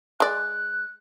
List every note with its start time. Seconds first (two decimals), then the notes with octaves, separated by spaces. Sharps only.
0.20 G#3 D5 F#6